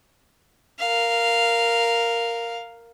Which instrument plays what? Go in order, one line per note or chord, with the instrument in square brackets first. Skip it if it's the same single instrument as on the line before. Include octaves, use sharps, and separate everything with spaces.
[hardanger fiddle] A#4 F5